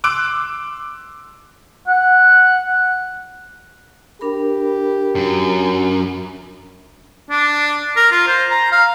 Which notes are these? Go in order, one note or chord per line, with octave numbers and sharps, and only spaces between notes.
C6 D6 E6 F#6 D7
F#5
D4 G4 A#4 B5
F#2
D4
A#4
F4
C5
A#5
F5